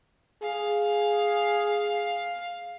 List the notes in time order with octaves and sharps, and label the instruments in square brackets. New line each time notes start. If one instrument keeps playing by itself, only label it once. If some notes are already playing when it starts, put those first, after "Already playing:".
[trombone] G#4 [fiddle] F5